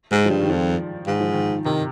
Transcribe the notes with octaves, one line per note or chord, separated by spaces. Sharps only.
G#2 G#3
F3
G2 G3
D#3
F2 F3
G#2 D#3
F3
D#3
C3 D#3